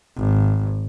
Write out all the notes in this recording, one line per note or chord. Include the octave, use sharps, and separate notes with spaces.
G#1